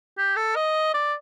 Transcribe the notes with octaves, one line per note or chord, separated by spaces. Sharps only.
G4
A4
D#5
D5